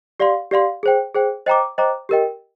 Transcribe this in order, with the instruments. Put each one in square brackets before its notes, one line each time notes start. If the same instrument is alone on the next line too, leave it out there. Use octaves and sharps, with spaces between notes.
[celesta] G4 D5 F5 C6
G4 D5 F5 C6
G#4 C5 G5
G#4 C5 G5
C5 D#5 G5 A#5 D6
C5 D#5 G5 A#5 D6
G4 A#4 D#5 G5